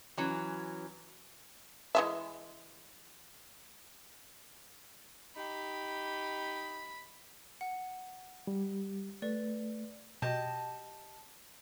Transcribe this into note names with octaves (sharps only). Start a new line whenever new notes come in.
E3 F#3 C#4
E3 G#3 E5
D#4 G4 B5
F#5
G3
A3 B4 D5
B2 G4 D#5 A5